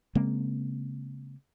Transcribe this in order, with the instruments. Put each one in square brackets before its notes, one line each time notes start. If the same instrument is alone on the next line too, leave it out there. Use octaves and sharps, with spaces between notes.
[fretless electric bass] C#3 G#3 A#3 C4